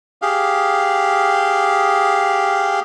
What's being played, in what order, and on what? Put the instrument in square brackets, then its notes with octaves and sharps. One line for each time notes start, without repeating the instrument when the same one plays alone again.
[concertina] G4 G#4 F5